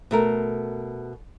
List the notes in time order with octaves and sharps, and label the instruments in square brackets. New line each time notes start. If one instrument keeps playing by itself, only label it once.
[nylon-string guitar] B2 A3 A#4